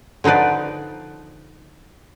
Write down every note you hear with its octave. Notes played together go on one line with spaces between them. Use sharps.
D3 F3 D#4 B4 D5